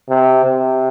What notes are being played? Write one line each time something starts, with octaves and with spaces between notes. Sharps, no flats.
C3
C3